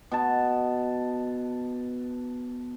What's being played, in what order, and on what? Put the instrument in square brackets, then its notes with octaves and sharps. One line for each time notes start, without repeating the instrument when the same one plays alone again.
[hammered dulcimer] B2 A5